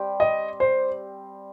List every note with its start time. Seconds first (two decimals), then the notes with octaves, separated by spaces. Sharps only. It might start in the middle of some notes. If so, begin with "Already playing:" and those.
Already playing: G3 C4 G4
0.20 D#5
0.60 C5